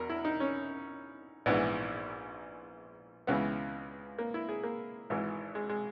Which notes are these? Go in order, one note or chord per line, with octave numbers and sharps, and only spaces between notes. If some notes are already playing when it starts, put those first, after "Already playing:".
Already playing: E2 B2 A#4
E4
D#4
C#4
A#1 G#2 E3 B3
C#2 C#3 E3 B3
A#3
E4
G#4
A#3
G#1 G#2 E3
G#3
G#3